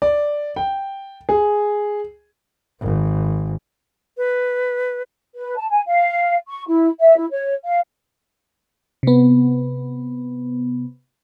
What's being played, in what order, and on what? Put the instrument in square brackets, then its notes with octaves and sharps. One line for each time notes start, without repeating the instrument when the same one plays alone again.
[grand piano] D5
G5
G#4
[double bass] G#1
[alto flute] B4
[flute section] B4
A5
G#5
F5
C#6
E4
E5
E4
C#5
F5
[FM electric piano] C3 B3